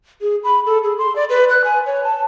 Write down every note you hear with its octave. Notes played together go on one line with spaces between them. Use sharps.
G#4
B5
A4
G#4
C6
D5
B4
F#6
G#5
C#5
A5